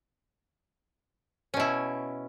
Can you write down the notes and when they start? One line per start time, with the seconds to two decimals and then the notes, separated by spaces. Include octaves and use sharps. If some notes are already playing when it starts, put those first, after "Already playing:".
1.54 C#4
1.57 B2
1.60 E4